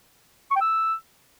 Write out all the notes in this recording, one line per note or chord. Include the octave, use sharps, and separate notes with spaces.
C#6
G5
E6